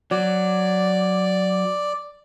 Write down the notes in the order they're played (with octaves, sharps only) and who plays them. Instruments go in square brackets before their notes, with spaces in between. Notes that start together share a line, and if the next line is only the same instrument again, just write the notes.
[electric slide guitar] F#3 [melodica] D5